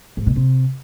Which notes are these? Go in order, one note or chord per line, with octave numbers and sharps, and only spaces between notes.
G#2
B2
C3